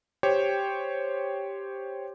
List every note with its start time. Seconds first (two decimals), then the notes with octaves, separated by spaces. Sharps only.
0.23 G4 C5 C#5 G5